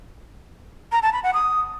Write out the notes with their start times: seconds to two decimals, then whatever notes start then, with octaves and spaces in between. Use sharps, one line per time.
0.92 A#5
1.02 A5
1.13 B5
1.23 F#5
1.34 D#6